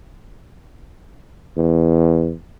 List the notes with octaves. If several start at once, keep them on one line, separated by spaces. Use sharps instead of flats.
E2